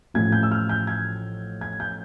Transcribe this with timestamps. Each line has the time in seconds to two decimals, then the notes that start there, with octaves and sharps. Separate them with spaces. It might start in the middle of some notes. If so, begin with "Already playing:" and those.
0.14 A1 A2 F3 G#6
0.32 G6
0.43 E6
0.51 F6
0.69 G6
0.87 G#6
1.61 G#6
1.80 G6